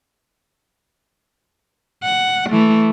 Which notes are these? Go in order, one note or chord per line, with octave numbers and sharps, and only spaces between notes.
F#5
E3 A3